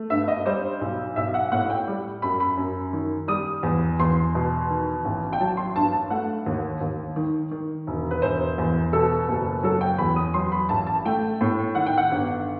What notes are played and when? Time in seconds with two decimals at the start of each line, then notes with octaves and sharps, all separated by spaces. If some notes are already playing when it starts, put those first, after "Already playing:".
Already playing: A3
0.10 G2 E5
0.28 D#5
0.45 G3 C5
0.81 B1
1.16 B1 E5
1.34 F#5
1.52 A2 F#5
1.70 G5
1.87 G3
2.22 F#2 B5
2.40 B5
2.57 F#2
2.93 D#3
3.28 G3 D#6
3.63 E2
4.00 E2 C6
4.35 B2
4.70 D#3
5.05 A1
5.33 G5
5.40 F#3 A5
5.57 C6
5.76 G2 A5
5.93 A5
6.10 A3 F#5
6.46 D#2
6.81 D#2
7.16 D#3
7.51 D#3
7.87 E1
8.11 B4
8.22 E1 C5
8.58 E2
8.93 B2 A4
9.28 F#1
9.63 F#3 A4
9.81 G5
9.98 E2 B5
10.16 D#6
10.34 F#3 C6
10.52 B5
10.69 A1 A5
10.87 A5
11.05 A3 G5
11.41 A2
11.75 D#3 F#5
11.86 G5
11.98 F#5
12.11 G1